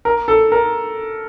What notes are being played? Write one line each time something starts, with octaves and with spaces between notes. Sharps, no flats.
A#4
A4
A#4